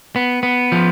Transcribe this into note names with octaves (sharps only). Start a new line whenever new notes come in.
B3
B3
F3